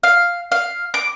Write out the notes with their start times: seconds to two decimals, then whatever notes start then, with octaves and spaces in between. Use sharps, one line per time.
0.03 F5
0.52 F5
0.94 D6